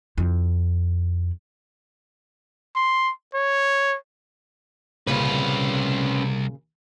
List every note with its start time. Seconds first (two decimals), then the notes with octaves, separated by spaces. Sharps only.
0.18 F2 E4
2.76 C6
3.35 C#5
5.07 C2 A#2 C#3 C#4 B4